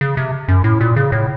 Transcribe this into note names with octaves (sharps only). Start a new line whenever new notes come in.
C#3
C3
F#2
A2
A#2
C#3
A2